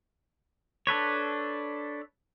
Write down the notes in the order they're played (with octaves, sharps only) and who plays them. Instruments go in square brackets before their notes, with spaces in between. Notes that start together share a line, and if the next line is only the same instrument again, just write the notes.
[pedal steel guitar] D4 A4 B4 C#5